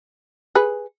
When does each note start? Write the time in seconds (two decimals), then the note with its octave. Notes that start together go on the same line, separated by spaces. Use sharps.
0.55 G#4 B4